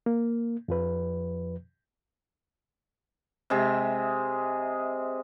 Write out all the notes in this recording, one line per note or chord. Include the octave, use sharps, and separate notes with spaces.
A#3
F2 F3 B4
C3 G#3 G#4 E5